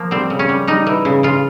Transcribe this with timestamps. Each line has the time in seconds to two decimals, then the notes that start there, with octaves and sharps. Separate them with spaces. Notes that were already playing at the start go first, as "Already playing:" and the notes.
Already playing: F3 A#3
0.11 G3 C4
0.30 C#3
0.39 C#4
0.49 G3
0.67 G3 D#4
0.87 E3
1.05 C#3
1.23 C#3 F4